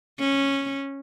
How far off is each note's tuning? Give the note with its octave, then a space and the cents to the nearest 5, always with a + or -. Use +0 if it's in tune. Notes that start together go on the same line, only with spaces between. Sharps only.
C#4 -10